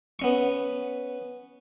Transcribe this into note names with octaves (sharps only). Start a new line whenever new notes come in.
B3 C#4 C#6